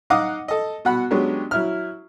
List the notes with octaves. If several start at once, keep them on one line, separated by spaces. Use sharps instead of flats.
D#4 D#5 F5 F#5 D6 D#6
A4 D#5
B2 F#5 B5
F#3 G#3 B3 C#4 D4 G4
F#3 E4 F6